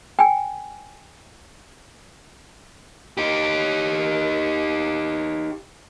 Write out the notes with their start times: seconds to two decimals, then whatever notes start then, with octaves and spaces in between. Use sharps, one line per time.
0.19 G5 G#5
3.18 D#4 G4